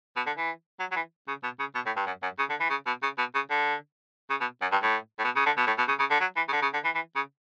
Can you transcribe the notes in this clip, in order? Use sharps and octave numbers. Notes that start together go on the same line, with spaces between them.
B2
D3
E3
F#3
F#3
E3
C#3
B2
C#3
B2
A2
G2
F#2
F#2
C#3
D3
E3
C#3
B2
C#3
B2
C#3
D3
C#3
B2
F#2
G2
A2
A2
B2
C#3
D3
B2
A2
B2
C#3
C#3
D3
F#3
E3
C#3
D3
C#3
D3
E3
E3
C#3